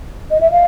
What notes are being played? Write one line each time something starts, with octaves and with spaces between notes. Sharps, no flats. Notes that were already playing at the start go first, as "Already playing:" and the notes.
D#5
E5
F5